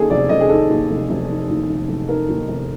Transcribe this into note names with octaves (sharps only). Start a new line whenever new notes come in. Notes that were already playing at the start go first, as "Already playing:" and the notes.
Already playing: D#2 D#3 G#4 A4
F1 D5
F1 D#5
G#4
D#3 A4
D#2
F1
F1
D#3
D#2
F1
F1
D#3 A#4
D#2
F1